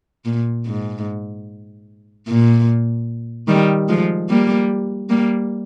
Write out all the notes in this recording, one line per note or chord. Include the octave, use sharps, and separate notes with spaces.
A#2
G#2
A#2
D#3 G3
F3 G#3
G3 A#3
G3 A#3